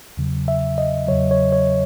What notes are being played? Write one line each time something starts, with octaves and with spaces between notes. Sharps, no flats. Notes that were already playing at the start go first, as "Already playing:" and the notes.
E2 C#3 F#3
E5
D#5
E2 C#3 F#3 C#5
C#5
C#5